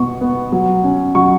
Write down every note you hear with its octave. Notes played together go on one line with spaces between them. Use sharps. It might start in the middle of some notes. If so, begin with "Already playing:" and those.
Already playing: B2 B3 C#6
B3
F#3
C#4
F#3 C#6